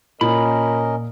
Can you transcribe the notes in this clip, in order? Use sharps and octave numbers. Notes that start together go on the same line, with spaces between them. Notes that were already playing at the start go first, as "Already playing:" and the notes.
A#2 C#4 A#4 D#5 B5